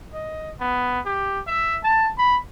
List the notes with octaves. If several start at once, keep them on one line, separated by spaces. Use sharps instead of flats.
D#5
B3
G4
E5
A5
B5